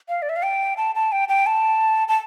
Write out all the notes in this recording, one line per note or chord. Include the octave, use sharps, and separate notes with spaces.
F5
D5
E5
F5
G5
A5
A5
G5
G5
A5
A5